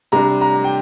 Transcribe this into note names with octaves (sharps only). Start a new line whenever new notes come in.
C3 G3 D4 A#5
A#5
G5